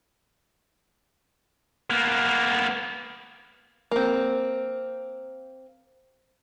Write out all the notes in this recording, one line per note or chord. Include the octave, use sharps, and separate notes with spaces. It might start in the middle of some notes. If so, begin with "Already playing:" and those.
A#3 B3
A#3 C4